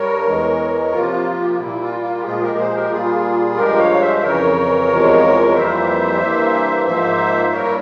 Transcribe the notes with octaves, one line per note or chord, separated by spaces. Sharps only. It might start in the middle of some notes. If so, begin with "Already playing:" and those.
Already playing: G2 G3 A#4 C#5
E2 E3 G#3
C3 F3 A#3 F4
G4
F4
A#2 G3 A#3 E4
F4
F4
G4
A#2 F3 G#3 F4 G#4
G4 A#4
G#4 C5
G4 A#4
A#2 G3 A#3 F4 G#4
G2 F3 G#3 G4 A#4
C#5 F5
C5 E5
E5
F2 C#3 E3 A#4 C#5
E2 C3 F3 G#3
C#5
F2 E3 G3 A#3 C5 E5
G2 E3 A#3
G#2 F3 A#3 C5 E5
G2 G3 A#3 A#4 C#5
E4